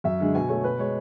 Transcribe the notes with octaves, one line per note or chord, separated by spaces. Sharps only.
F#2 E5
D3 G#3
B2 G#5
A3 C#5
B2 B4
G#3 C#5